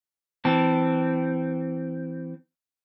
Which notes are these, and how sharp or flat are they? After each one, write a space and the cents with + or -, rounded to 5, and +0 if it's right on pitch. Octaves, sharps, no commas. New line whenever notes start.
E3 +0 C4 -15 A5 +0